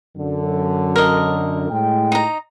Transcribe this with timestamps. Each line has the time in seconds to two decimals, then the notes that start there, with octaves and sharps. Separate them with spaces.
0.17 F#2 D3
0.96 A#4 D#5
1.71 A2 G#3 G5
2.12 D#4 A#5